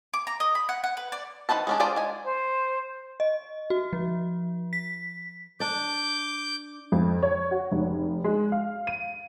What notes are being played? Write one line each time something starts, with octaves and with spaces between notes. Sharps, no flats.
D6
A#5
D#5
B5
F#5
F#5
B4
D5
D#3 D#4 B4 C5 A5
G#3 C#4 D4
D4 F4 G#4 C5 D5
G#3 G#5
C5
D#5
F#4
F3
B6
D4 D5 D6 G6
F2
C#5
F#4
F1
G#3
F5
D#7